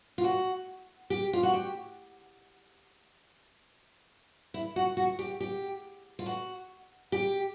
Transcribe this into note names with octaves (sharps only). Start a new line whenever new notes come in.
F4
F#4
G4
F4
F#4
G4
E4
F#4
F#4
G4
G4
F4
F#4
G4